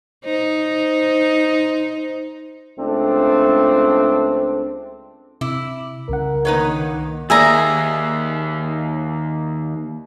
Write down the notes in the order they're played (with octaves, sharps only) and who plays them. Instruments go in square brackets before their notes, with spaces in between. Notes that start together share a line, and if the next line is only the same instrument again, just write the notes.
[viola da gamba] D#4 [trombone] C5
[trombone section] C#2 A3 C4 D4
[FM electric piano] C3 D6 [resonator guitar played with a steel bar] E4
[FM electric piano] C2 C#3 F#5 [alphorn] A#4
[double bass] D#3 A#3 [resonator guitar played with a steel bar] D#4 B4 C#5
[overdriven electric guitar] D#2 A#3 [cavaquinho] G#4 G#5 A#5 [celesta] D5 E5 E6